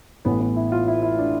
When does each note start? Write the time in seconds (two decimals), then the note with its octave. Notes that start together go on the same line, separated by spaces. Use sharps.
0.25 A1 A2 E3 B3
0.40 B3
0.56 E4
0.72 F4
0.88 E4
1.02 E4
1.18 D4